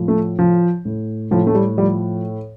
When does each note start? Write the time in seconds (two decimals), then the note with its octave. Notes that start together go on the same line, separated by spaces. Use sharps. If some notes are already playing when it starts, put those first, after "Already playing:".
Already playing: A2 F3
0.08 A3
0.39 F3
0.85 A2
1.31 A2 F3
1.47 A3
1.55 G3
1.77 F3 G3